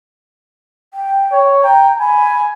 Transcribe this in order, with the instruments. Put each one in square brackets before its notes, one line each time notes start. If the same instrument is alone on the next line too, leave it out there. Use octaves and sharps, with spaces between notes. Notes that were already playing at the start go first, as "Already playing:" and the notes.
[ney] G5
[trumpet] C#5
[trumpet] G5 [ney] A#5
[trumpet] G#5 [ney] B5